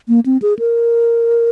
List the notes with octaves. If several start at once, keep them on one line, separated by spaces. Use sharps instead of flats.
A#3
C4
G#4
A#4